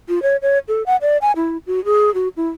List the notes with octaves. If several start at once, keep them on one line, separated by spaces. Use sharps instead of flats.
F4
C#5
C#5
A4
F#5
D5
G#5
E4
F#4
G#4
F#4
E4